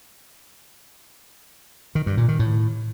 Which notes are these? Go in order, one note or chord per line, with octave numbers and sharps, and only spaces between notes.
D#3
G2
A#2
D#3
A2